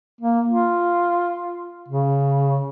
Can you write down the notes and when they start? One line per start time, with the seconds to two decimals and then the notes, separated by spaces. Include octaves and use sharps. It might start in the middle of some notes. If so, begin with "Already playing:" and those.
0.21 A#3
0.48 F4
1.89 C#3